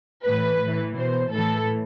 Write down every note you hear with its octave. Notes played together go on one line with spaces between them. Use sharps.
A2 E3 B4
A2 E3
B2 C5
A2 E3 A4